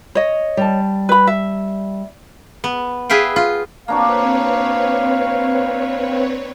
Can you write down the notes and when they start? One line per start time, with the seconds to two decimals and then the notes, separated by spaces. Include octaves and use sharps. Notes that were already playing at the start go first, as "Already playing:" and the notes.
0.15 C#5 D#5
0.57 G3 A5
1.09 B4 B5
1.27 E5
2.64 B3
3.10 G#4 B4 E5 F5 G5
3.36 F4
3.88 A#3 C4 D4 F#4 B4 C#5 F5